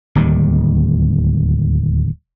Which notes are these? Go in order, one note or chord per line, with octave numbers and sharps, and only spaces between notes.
D1 D#2 D#3 G3